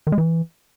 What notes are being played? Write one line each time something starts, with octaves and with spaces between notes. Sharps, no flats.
D#3
G#3
E3